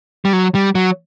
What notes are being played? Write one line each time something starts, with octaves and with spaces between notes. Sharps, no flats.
G3
F#3
G3
F#3